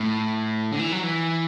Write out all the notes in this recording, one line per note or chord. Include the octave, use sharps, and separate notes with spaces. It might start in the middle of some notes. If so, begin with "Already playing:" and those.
Already playing: A2
D3
E3
F#3
E3